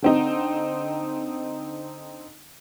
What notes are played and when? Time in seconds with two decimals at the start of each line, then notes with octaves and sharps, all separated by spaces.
0.02 D3 C4 D#4